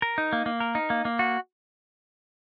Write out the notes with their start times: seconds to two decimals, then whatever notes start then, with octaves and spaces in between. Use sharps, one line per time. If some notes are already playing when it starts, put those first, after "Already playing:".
0.02 A#4
0.18 D#4
0.33 A#3
0.46 A#3
0.60 A#4
0.75 D#4
0.90 A#3
1.05 A#3
1.19 F#4